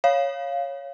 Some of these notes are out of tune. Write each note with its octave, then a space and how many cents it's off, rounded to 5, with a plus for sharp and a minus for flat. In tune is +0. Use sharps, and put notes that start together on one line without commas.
C#5 +0 F5 +0